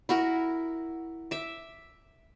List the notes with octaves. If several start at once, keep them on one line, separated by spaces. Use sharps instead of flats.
E4 F#4 A#4
E5 D6